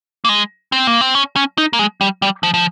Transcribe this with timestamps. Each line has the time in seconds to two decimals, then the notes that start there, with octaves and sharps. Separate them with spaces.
0.25 A#3
0.29 G#3
0.72 C4
0.87 A#3
1.01 C4
1.15 C#4
1.36 C#4
1.58 D#4
1.73 A#3
1.79 G#3
2.01 G3
2.22 G3
2.43 F3
2.54 F3